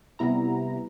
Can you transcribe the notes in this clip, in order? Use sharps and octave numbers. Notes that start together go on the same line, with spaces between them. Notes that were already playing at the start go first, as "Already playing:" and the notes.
C3 G3 B3 E4 A#5